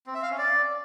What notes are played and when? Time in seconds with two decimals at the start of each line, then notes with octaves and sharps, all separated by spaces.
0.07 C4
0.14 E5
0.22 F5
0.30 C#4
0.38 D5